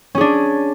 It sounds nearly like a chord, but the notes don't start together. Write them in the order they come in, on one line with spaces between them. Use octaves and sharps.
C#4 G#4 D4